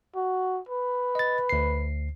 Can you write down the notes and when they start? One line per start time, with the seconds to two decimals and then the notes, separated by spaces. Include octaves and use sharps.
0.15 F#4
0.69 B4
1.15 D#5 A6
1.49 D2 C7